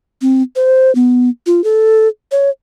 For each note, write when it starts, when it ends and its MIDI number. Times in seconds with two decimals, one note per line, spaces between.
0.22 0.42 60
0.56 0.94 72
0.95 1.29 59
1.46 1.64 65
1.64 2.08 69
2.32 2.50 73